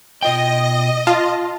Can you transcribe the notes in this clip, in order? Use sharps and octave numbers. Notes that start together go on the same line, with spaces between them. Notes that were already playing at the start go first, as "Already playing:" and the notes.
B2 F4 D#5 G5
F4 A5